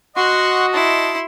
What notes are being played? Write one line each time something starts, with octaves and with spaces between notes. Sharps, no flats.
F#4 D#5 F#5 C6 C#6
E4 A5 C6